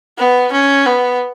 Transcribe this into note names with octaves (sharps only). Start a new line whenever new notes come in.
B3
C#4
B3